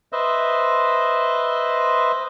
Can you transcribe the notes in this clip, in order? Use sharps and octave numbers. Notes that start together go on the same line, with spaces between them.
B4 C5 D#5 E5